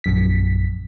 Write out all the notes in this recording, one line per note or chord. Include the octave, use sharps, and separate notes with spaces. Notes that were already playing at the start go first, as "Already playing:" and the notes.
A#1 F#2 B6